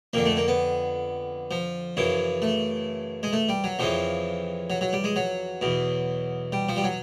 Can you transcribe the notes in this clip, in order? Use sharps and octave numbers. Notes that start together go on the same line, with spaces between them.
F2 D3 A#3
A3
A#3
B3
F3
F#2 C#3 E3
A3
G#3
A3
G3
F#3
F2 C#3 E3 F3
F#3
F#3
G3
G#3
F#3
E2 B2
G3
F3
G3
F#3